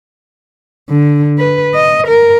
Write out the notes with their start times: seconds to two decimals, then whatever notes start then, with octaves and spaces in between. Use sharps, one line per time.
0.90 D3
1.38 B4
1.74 D#5
2.07 A#4